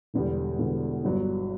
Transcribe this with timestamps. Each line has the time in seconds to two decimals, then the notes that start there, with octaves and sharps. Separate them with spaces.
0.14 E1 E2 D3 G3
0.59 E1 E2 D3 G3
1.04 G1 G2 F#3